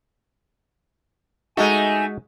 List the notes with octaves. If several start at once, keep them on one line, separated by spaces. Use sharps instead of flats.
G#3 A3 D#4 F#4 G#5